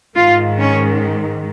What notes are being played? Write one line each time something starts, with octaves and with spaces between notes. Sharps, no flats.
G#2 D#3 F4
C#4